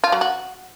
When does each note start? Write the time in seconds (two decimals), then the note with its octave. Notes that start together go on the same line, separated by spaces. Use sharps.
0.04 F4
0.12 F#3
0.21 F#4